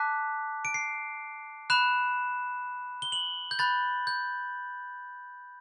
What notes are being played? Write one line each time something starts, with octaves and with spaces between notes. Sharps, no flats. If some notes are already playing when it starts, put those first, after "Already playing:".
Already playing: A5 D6 F#6 B6
D7
C7
B5 F#6 E7
G7
F#7
G6
B5 F#6 A6
G6